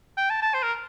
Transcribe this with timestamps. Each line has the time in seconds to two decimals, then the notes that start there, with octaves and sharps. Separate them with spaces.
0.17 G5
0.30 A5
0.42 A5
0.54 C5
0.63 A#4